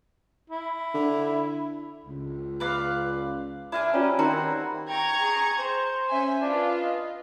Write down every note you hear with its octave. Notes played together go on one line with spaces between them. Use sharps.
E4
D3
C#2
B4 D5 F5
D4 E4 A#4 G#5
F#3 G3 C#4 F4 C#5 D5 G5
D#3 C4 D#4 F#4 A#5
G5 A#5 C#6 G#6
G#4
C5
C#4 E5 G#5
D4 F4 B4
D#5